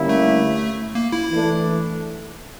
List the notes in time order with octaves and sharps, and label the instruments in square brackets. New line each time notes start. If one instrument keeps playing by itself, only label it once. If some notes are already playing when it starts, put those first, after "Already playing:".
Already playing: [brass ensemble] D3 G3 A#3 C#4 E4
[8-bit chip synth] A3
A#3
E4
[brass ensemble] E3 A3 D4